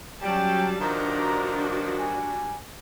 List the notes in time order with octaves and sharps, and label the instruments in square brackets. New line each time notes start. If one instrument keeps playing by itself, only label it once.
[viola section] F#3 C#4 A5 [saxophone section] G3 [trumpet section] G5
[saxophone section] G2 D#3 F3 [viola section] D4 F#4 [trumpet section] D5 A#5
[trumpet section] G3 G#5